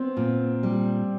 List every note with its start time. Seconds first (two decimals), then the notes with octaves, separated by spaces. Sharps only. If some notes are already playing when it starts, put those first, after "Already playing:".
Already playing: B3 C4
0.17 A#2
0.63 G3